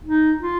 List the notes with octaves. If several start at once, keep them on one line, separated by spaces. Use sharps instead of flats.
D#4
F4